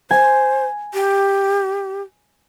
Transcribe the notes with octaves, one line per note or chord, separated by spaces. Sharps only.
C5 G#5
G4